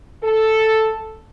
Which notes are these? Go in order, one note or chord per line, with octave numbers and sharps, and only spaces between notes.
A4